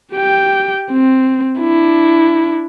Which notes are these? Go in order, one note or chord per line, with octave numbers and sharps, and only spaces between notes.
G4 G5
C4
D4 E4